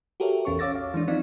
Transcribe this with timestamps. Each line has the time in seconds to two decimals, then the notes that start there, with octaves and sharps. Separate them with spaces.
0.20 F#4 G4 A4 A#4 C#5 E5
0.45 A#1 E2 C#4 A4 C#6
0.59 C#5 F5 D6 E6 A6 A#6
0.75 F5
0.94 E3 G#3 D4
1.08 F3 C4 D#4 D5 F5